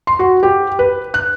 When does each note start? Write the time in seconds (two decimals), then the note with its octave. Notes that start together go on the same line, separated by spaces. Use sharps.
0.07 C6
0.19 F#4
0.43 G4
0.79 B4
1.14 F#6